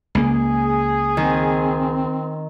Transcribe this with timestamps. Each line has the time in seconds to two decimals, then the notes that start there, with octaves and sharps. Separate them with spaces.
0.15 C#2 A#3 G#4
1.17 D#3 C4